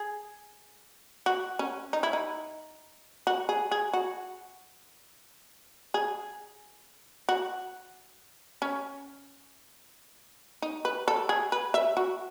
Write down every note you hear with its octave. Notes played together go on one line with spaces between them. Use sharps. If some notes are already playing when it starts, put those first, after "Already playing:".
Already playing: G#4
F#4
C#4
D#4
E4
D#4
F#4
G#4
G#4
F#4
G#4
F#4
C#4
D#4
B4
A4
G#4
B4
E5
F#4